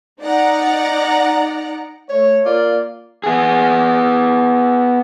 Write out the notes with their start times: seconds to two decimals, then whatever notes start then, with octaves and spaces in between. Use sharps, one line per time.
0.21 D#4 D5 F#5 A#5
2.09 A3 C#5
2.45 A#3 F4 D5
3.24 B3 G#4